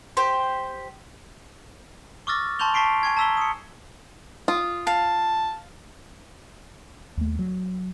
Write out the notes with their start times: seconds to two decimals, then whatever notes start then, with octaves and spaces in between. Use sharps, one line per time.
0.17 G4 C5
2.27 C#6 D6 E6 F6 A6 A#6
2.59 A5 C6 C#6 G6 F7 G7
2.74 A5 C#6 B6 C7 D7
3.03 G#5 C#6 G#6
3.17 A5 A#5 E6 B6 G7
3.37 D#6 C#7
4.48 F4 D#6
4.87 F5 A5
7.17 D#2 A3
7.39 F#3